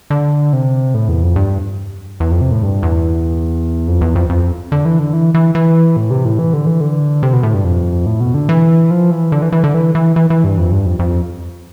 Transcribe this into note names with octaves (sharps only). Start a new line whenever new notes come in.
D3
C3
A2
E2
F2
G2
E2
F2
C3
A2
G2
E2
F2
E2
F2
F2
D3
E3
D3
E3
E3
E3
A2
C3
A2
E3
D3
E3
D3
C3
B2
A2
G2
F2
A2
B2
D3
E3
F3
E3
D3
E3
E3
D3
E3
E3
E3
E3
G2
F2
G2
F2
F2